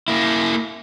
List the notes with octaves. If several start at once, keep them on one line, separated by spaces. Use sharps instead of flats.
A#3 E4